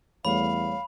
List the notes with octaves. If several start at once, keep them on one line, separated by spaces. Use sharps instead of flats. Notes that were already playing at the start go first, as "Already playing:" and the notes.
E2 G3 A3 C#5 F5 B5